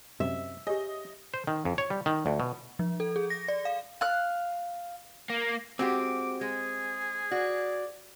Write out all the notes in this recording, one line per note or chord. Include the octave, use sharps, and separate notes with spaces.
F#2 C3 E5
G4 G#4 C#5 D#5
C5
D#3
F2
C#5
G3
D#3
D2
B2
F3
A4
G#4
A#6
D5
F5
F5 F#6
A#3
G#3 C4 F#4 G4 D6
G#3 G#4
F#4 D5